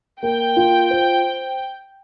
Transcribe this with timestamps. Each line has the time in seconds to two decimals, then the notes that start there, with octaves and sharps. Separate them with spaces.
0.23 A#3 G5
0.57 F4
0.91 C5